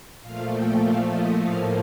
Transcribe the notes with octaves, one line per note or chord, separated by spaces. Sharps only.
A#2 F3 A3 F5
G5
F5
D#5
A2 F3 A#3 F5